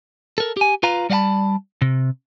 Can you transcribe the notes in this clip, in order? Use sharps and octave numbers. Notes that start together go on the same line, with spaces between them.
A4 A#4
G4 G#5
F4 B4 F5 A#5
G3 D5 D#5 F5 A5 B5
C3